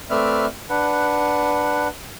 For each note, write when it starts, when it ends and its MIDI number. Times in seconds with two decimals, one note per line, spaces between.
0.10 0.46 57
0.10 0.46 60
0.10 0.46 71
0.10 0.46 74
0.10 0.46 76
0.10 0.46 89
0.70 1.88 62
0.70 1.88 71
0.70 1.88 78